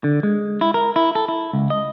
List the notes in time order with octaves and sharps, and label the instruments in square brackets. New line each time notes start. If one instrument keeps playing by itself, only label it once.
[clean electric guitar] D3
G#3
E4
A#4
E4
A4
E4
C#2
D#5